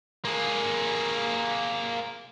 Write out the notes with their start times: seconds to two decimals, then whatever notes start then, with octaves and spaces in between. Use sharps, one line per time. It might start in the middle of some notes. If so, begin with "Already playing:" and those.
0.25 A#3 G#4